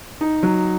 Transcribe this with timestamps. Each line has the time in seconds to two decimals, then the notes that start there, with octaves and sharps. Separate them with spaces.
0.21 D#4
0.43 F#3